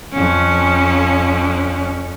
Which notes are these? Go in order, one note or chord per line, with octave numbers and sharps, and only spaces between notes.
F2 C#4